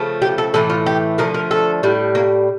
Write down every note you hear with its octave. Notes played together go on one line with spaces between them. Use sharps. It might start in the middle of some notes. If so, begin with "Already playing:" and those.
Already playing: C#3 F3 A3
G4
A4
A2 E3 A3 A4
F4
G4
D3 F3 A3 A#4
A#4
A4
A2 G3
A#3